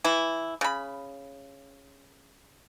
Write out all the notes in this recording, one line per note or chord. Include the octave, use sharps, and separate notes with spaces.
E3 E4
C#3 B5